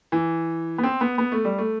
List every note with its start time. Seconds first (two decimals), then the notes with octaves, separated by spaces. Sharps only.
0.12 E3
0.78 B3
0.83 C4
1.01 B3
1.18 B3
1.32 A3
1.45 G3
1.58 A3